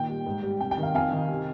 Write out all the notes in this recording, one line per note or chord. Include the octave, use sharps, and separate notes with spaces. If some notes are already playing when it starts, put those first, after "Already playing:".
Already playing: A#2 D#3 G5
G3
G#2
G3
C3 G5
G5
D#3
F5
F2 F5 G#5
D#3
C3